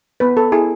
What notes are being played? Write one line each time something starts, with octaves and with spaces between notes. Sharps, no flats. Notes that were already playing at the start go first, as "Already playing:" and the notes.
B3 B4
A4
E4 G#4